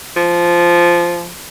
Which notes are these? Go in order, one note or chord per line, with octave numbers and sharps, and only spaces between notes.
F3